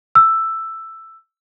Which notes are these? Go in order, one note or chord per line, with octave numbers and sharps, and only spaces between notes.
E6